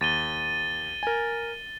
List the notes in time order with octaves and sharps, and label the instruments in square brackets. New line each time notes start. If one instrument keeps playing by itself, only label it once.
[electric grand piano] D#2 [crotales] A6 D#7 G7
[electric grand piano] A#4 G#5